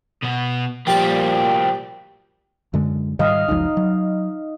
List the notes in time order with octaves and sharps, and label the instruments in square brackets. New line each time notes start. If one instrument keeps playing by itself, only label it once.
[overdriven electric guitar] B2 B3
[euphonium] A#2 [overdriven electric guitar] F3 G3 [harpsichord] A#3 G4 A5 [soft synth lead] G5
[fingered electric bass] F#2 D3 G#3
[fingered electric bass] G#2 D#3 G3 [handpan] D#5 F5
[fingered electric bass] F#1 C#2 F3 [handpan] D#4
[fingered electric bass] F#3